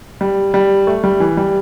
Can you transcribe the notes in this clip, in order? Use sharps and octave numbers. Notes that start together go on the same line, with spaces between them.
G3
G3
A3
G3
E3
G3